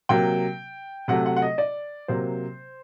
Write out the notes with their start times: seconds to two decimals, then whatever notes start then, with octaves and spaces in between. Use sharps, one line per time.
0.09 C3 F#3 A#3 G5
1.08 C3 F#3 A3 F#5
1.26 F#5
1.36 F#5
1.42 D#5
1.58 D5
2.08 C3 F#3 A#3 C5